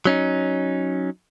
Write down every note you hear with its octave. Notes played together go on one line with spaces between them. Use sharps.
F#3 C#4 D#4